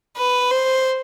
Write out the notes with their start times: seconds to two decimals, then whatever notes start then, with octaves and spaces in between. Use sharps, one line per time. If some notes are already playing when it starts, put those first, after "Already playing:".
0.17 B4
0.51 C5